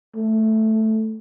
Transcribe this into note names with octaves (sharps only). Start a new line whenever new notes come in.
A3